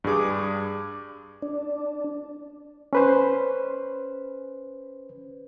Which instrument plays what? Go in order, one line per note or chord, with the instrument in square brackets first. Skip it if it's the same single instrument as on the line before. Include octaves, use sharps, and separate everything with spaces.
[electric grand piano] G2 G3 G#4 D6
[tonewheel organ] D4
[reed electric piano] C#4 B4 C5